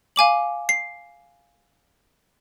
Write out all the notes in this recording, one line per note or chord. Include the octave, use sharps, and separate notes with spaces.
F5 G#5 D6 F#7
C7